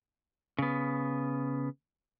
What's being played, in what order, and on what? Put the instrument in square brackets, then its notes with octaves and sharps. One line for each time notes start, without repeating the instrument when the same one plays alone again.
[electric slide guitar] C#3 B3